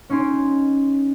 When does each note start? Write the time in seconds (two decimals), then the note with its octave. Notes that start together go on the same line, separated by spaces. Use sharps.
0.10 C#4 D#4 G#5 C6 D7